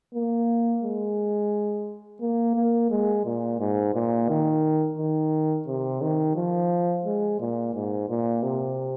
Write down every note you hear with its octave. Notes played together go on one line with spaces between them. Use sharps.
A#3
G#3
A#3
A#3
G#3
A#2
G#2
A#2
D#3
D#3
C3
D#3
F3
G#3
A#2
G#2
A#2
C3